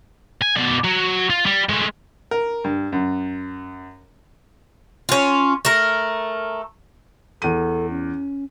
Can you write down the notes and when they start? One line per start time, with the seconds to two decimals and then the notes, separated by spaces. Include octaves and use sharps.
0.42 G#5
0.57 B2 D5
0.84 F#3
1.30 F4
1.46 G3
1.69 G#3 A3
2.31 A#4
2.64 G2
2.92 F#2
5.09 C#4 F4
5.65 A3 A#4
7.42 E2 A4 D#7
7.90 C#4